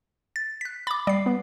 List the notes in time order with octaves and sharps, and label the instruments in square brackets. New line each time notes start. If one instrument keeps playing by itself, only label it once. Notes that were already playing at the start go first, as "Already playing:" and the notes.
[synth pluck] A6
F#6 B6
[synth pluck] B5 D6 [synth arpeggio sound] A6
[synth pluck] G3 C7 [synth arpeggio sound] D5
[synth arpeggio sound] B3